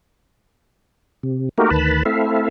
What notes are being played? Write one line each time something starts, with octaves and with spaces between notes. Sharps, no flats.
C3
A3 A#3 D#4 F#4 G4 A#4
D2 D#3 B4 A5 B5
A3 C4 E4 A4 E5 F5